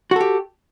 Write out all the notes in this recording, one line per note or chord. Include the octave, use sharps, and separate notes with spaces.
F#4 G4 A4